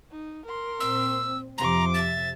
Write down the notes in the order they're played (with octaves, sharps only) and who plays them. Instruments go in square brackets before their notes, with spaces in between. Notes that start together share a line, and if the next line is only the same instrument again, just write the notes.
[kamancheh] D#4
A#4 C6
[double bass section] A#2 C4 [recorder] E6
[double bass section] F2 C3 F3 [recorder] A#5 [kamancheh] C6 D6
[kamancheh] E5 [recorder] A6